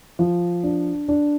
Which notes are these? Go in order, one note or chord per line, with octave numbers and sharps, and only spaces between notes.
F3
D4
D4